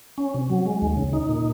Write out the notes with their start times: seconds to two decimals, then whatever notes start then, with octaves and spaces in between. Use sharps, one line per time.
0.18 C#4
0.34 C3
0.50 F#3
0.66 G#3
0.82 D#2
0.97 C#3
1.13 D#4
1.29 A#2